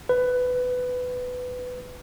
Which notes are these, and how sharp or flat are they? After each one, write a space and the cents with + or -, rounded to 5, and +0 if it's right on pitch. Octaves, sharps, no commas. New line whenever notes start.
B4 +15